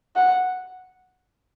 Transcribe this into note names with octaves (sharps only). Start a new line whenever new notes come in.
F#5